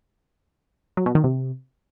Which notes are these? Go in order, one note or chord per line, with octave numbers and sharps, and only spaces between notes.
F#3
B2
D#3
C3